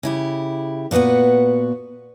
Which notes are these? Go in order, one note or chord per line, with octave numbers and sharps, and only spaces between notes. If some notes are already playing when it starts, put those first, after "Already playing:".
C#3 E4 G4
A#2 B3 F#4 B4 F#5